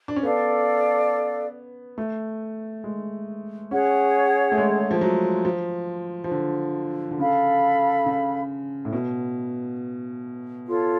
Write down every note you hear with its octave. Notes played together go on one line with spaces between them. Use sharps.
D4
C#4
B3 A4 D5 F5
A3
G#3
C#4 G#4 C#5 F#5
A3
G#3
F3
F#3
F3
F3
D3
D3
C#3 A4 F5 B5
C#3
A2
B2
F4 A4 C#5